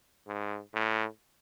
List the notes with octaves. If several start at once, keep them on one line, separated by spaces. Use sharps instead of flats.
G#2
A2